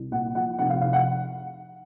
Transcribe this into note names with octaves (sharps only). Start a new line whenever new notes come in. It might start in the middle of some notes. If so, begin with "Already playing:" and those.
Already playing: C2
A#2 F#5
F3 F#5
F1 F#5
F5
F1 F5
F#5